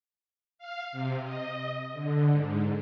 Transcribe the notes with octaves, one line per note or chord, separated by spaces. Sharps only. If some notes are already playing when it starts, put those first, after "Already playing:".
F5
C3
D#5
D3
G#2